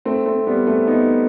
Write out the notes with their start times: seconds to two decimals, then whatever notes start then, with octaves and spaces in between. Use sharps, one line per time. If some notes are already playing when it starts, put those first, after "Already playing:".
0.05 A3 C4
0.26 A3 C4
0.47 G3 B3
0.66 A3 C4
0.87 B3 D#4